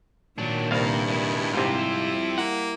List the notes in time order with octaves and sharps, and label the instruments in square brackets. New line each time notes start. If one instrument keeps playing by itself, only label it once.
[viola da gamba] A#2 D#3 [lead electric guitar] F#3 D4
[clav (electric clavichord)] C2 F5 [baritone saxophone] G2 [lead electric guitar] A#3
[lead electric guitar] G#3 E4
[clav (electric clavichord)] G#2 C3 [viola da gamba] G3 E4 [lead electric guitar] C4 F4
[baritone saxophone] A#3 [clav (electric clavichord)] F#5